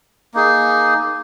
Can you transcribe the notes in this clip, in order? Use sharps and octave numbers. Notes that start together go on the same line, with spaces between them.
A#3 D#4 G#4